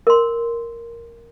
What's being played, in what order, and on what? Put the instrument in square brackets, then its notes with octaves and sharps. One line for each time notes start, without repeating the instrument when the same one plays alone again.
[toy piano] A#4 C6